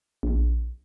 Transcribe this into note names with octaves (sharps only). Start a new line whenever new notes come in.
A#1